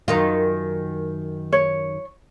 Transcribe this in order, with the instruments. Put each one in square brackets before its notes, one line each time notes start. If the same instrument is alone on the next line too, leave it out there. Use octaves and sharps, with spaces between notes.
[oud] F#2 D#3 F4
[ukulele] C#5